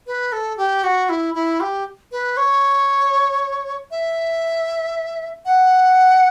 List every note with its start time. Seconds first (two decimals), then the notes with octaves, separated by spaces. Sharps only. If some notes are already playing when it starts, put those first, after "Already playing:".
0.07 B4
0.32 A4
0.57 G4
0.83 F#4
1.09 E4
1.34 E4
1.60 G4
2.12 B4
2.37 C#5
3.91 E5
5.45 F#5